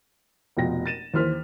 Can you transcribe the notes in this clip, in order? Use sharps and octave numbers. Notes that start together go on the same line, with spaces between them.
F1 B2 F4 G5 A#6
A6 D#7 E7
D#2 E3 C5 F6 B6